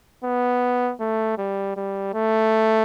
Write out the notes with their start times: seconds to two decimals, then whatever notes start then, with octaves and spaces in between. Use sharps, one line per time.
0.24 B3
1.00 A3
1.38 G3
1.76 G3
2.14 A3